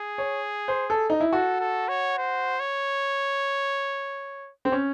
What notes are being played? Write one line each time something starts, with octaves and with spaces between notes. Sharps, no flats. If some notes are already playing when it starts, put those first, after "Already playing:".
Already playing: G#4
C#5
C5
A4
D#4
E4
F#4 A4
A4
C#5
C5
C#5
C4
C#4